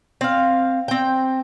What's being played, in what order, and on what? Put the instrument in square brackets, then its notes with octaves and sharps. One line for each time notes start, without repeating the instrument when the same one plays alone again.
[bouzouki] C4 F5
C4 G5